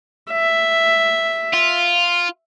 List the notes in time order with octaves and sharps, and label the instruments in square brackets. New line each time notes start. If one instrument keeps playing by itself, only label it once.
[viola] E5
[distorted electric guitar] F4